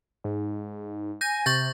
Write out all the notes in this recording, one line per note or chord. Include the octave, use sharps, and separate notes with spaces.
G#2
G#5 G6 A#6
C3 C#6 G6 A6